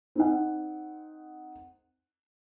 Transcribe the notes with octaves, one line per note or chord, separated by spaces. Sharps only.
C4 D#4 F#5